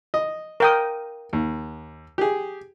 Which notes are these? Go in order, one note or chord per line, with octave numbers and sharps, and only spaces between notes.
D#5
A#4 G5 D#6
D#2
G4 G#4